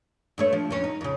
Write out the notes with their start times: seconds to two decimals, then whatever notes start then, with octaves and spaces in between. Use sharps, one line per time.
0.38 G2 A3 C#5
0.53 F3
0.70 F2 C#4
0.84 D#4
1.01 F2 C#3